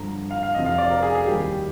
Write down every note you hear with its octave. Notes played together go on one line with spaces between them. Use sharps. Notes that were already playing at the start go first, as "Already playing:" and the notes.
Already playing: G1 G2 D3 F3 A#5
F5
F5
F1 F2 C3 F3 D#5
F5
D5
A#4
G#4
G#4
D#2 D#3 G3 A#3 G4